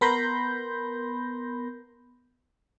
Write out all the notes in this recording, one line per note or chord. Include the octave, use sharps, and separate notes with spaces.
B3 A#4 B5 C6 G6 A#6